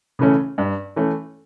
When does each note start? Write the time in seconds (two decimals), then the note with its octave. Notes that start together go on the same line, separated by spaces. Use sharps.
0.19 C#3 E3 A3 C#4
0.58 G2
0.96 E3 A3 C#4